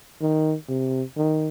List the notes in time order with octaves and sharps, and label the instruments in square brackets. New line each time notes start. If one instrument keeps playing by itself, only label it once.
[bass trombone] D#3
C3
D#3